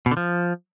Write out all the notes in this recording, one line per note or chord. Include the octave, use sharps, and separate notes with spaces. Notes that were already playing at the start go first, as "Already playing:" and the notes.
B2
D3
F3